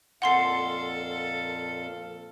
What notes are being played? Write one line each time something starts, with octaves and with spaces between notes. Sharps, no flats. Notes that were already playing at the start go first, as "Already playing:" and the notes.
F2 A#2 A4 F5 F#5 C6 C7